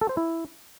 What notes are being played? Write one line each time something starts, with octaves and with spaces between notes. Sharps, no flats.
A4
C5
E4